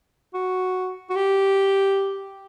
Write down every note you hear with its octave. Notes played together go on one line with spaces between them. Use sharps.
F#4
F#4
G4